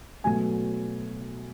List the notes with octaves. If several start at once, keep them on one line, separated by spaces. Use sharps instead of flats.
B2 F#3 A3 G#5